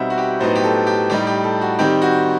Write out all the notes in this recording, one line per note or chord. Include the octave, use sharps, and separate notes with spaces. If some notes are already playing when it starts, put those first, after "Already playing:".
Already playing: B2 G3 C4 D#4 E5 F#5
F#4
G4
A2 F#3 B3 D#4 C5
G4
A4
G4
A2 G3 D#4 G4
G4
A4
F#4
D#3 G3 C4 D#4 G4
F#4